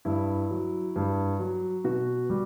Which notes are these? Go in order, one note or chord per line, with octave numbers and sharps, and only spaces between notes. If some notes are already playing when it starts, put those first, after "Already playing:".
G2 E4
F#3
G2
F#3
B2 F#4
G3